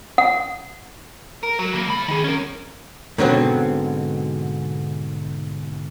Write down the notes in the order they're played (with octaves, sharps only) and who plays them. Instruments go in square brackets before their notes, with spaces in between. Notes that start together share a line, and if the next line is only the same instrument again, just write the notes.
[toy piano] F#5
[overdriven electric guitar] A#4
F#3
C#3 A#3
A3 B5
D#3 G#4
C#4 A#4
[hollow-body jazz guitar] G#2 B2 D3 F#3 B3 C4